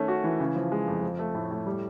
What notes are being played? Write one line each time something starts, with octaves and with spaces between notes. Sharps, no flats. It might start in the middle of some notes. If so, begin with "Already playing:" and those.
Already playing: D#3 A3 C#4
F#4
E3
C#3
F3
G#3
F2
F3
A3
A2
A2
G3